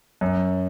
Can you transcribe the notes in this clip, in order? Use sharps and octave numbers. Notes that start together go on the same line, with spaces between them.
F#2